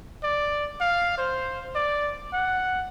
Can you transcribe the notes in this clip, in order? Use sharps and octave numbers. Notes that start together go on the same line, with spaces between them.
D5
F5
C5
D5
F#5